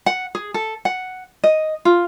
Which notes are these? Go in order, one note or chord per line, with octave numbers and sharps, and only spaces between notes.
F#5
G#4
A4
F#5
D#5
F4